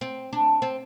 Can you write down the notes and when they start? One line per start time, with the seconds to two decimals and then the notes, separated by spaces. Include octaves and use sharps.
0.01 C4
0.33 D4
0.62 C4